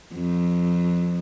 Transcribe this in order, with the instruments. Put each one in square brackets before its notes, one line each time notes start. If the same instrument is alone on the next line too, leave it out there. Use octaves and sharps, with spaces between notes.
[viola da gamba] F2